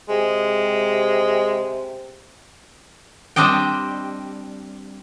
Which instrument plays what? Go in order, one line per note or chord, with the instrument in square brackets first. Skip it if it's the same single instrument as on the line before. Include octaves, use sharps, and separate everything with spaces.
[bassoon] C3 [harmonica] G#3
[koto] G3 C4 D4 D#5 G5